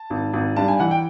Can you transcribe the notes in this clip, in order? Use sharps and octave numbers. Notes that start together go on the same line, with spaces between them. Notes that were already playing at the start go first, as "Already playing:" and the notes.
Already playing: A5
G#1
G#1
G2 A5
G#5
E3 F#5
G5